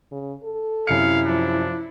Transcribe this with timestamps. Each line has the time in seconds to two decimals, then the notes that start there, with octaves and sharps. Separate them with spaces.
0.11 C#3
0.43 A4
0.87 F#2 C3 E4 F5 C#7
1.26 F3 D4